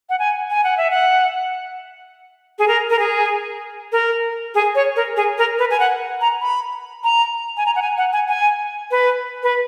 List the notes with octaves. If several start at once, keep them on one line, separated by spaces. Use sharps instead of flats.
F#5
G#5
G#5
F#5
E5
F#5
G#4
A#4
A#4
G#4
A#4
G#4
C#5
A#4
G#4
A#4
B4
G#5
F#5
A#5
B5
A#5
G#5
A#5
F#5
G#5
F#5
G#5
G#5
B4
B4